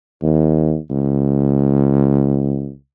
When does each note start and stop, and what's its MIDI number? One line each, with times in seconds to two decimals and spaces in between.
0.22 0.77 39
0.90 2.73 37